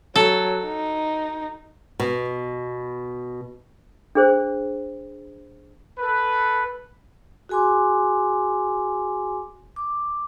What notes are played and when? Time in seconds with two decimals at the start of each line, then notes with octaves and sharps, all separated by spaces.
0.16 F#3 A4
0.66 D#4
2.00 B2
4.15 D4 G#4 C5
5.99 A4 B4
7.49 F#4 G#4 G#5 C6 D6
9.76 D6